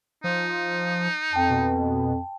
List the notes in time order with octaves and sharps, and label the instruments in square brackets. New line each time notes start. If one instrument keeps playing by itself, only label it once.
[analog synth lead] F3 [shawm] D#4
[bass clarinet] F2 [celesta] G5 A5
[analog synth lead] B2